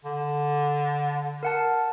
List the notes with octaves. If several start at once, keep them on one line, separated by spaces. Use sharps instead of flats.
D3
A#4 F#5 A5